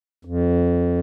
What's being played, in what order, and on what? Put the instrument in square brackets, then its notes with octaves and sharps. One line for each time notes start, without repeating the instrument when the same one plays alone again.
[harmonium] F2